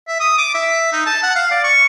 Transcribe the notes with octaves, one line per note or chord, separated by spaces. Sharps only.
E5
D#6
D6
E5
D#4
A5
F#5
F5
D5
C#6